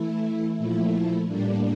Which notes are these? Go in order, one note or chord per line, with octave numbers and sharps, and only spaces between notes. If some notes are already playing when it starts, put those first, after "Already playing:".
Already playing: E3 A3 E4
A#2 F3 A3 E4
A2 G3 A#3 D4